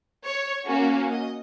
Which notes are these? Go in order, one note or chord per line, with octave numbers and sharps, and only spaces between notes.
C#5
A#3 C#4 F#4
D#5